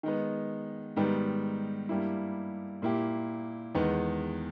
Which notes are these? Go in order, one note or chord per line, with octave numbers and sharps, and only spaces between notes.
D#3 G#3 B3
G#2 D#3 G3 B3
G2 G3 A#3 E4
A#2 A#3 E4 G4
E2 D#3 G#3 B3